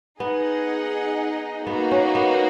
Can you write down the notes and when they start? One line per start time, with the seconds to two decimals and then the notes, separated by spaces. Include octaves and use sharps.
0.20 B3 D#4 G#4 D#5 F#5
1.66 A#3 B3 D#4 F#4
1.91 C#4
2.15 B3